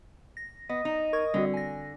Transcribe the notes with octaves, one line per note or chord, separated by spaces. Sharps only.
A#6
B3 D#5
D#4
A#4 C#6 G#6
D3 G3 C4 F#4
G#5 A#6